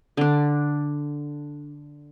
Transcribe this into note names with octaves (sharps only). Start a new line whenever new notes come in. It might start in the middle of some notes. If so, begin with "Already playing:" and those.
D3 D4